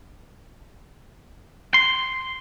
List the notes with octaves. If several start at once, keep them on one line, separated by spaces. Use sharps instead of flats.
C6